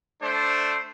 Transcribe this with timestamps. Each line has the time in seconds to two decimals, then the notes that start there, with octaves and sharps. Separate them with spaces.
0.22 A3 D4 C5